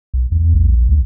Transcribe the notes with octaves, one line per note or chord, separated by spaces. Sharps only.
B1
E2
A#1
D2